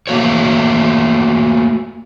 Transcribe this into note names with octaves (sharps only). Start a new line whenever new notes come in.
A3 A#3 F#4 C#5